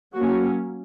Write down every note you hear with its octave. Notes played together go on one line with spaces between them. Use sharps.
F#3 A#3 C#4 F#4